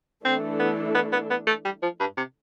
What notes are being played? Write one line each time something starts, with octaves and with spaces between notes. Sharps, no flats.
E3 A3 C4 D4 A4
B3
B3
B3
B3
A3
G3
F3
G2
C3